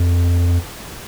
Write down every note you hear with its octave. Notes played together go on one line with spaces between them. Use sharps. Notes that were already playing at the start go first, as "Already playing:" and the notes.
Already playing: F2